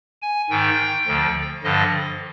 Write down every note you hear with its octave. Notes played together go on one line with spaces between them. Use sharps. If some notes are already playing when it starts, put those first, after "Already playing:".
G#5
G#2 D#3 G5
D2 D3 F3
G2 D3 F3 D#5